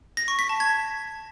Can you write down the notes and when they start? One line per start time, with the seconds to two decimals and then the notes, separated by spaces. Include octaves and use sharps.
0.17 A#6
0.28 C#6
0.39 B6
0.49 A5
0.60 G#6